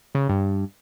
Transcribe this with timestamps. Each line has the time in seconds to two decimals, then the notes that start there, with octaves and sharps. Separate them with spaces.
0.15 C#3
0.29 G2